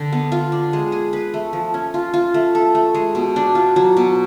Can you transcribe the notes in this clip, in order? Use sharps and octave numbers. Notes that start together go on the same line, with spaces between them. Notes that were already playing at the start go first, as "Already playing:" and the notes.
Already playing: D3
B3
F4
D4
G#3
G#4
B4
A3
F3
C#4
F4
F4
A3
A4
A3
G#3
B2
D4
F4
F#3
B2